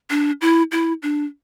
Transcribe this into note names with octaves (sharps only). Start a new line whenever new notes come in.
D4
E4
E4
D4